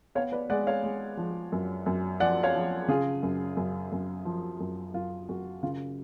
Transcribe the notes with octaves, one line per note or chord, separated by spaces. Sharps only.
B3 C#5 F5
B4 D5
G#3 D5 F#5
C#5 F5
G#3
F3
F#2
F#2
F3 D5 F#5
C#5 F5
F3
C#3 F4 G#4
F#2
F#2
F#2
F3
F#2
F#2 F4
F#2 F#4
C#3 F4